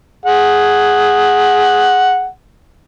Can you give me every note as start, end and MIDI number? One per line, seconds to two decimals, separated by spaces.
0.25 2.27 68
0.25 2.27 78